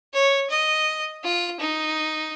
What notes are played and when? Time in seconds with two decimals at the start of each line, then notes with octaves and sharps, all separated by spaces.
0.14 C#5
0.50 D#5
1.23 F4
1.60 D#4